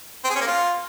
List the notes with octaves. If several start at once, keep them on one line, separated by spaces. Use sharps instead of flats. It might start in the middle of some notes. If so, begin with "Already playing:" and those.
C4
G#4
C#4
A#3
F4